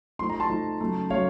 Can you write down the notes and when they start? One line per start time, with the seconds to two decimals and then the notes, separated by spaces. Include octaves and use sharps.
0.19 F3 A3 D#4 C6
0.30 A#5
0.40 A5 C6
0.50 F3 A3 D#4
0.81 C#3 F#3 A3
1.10 C#3 F#3 A3 C#5 F5